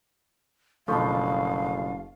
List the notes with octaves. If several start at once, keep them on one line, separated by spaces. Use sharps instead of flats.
F#1 B2 D3 F3 A3 A4 F5 C#6